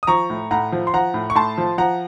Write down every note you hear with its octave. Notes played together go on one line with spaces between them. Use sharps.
D#6
F3 A#5 C#6
A2
A2 F#5 A#5
F3
C6
F3 F#5 A#5
A2
C#6
A2 A5 C6
F3
F3 F#5 A#5